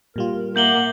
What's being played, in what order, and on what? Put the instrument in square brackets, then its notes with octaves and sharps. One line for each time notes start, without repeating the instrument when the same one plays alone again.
[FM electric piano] A#2 G3 F4 [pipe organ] A#4
[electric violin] A#3 [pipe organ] E5 F#5 D6 [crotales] G6 F#7 G7